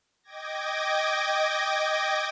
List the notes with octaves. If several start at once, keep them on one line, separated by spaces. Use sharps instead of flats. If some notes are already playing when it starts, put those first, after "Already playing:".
D#5 G5 D6 G#6 A#6